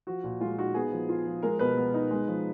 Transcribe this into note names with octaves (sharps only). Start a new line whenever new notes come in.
F3 F#4
A#2
G#3 F4
D#4 F#4
B3 G#4
F3
F4
F3
G#3 A#4
B2 B4
B3
D#4
G#3
F3